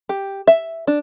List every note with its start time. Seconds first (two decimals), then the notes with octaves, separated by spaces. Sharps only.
0.09 G4
0.47 E5
0.87 D4